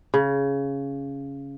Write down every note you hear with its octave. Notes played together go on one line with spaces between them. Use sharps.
C#3